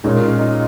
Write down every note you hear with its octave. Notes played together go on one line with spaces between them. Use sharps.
A#2 G#3 C#4 D#4
F4
D#4